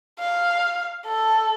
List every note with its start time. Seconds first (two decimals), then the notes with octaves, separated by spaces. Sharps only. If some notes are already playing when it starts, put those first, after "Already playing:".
0.19 F5
1.06 A4